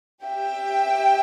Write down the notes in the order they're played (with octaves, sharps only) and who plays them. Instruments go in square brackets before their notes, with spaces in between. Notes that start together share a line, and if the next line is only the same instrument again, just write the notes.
[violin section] G4 E5 G5